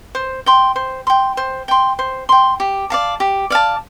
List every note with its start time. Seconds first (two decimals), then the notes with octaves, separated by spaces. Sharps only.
0.15 C5
0.46 G5 C6
0.76 C5
1.07 G5 C6
1.37 C5
1.68 G5 C6
1.99 C5
2.29 G5 C6
2.60 G4
2.90 D5 F5 A5
3.20 G4
3.50 D5 F5 A5